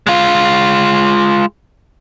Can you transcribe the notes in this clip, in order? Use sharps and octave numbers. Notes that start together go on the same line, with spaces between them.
G#3 F4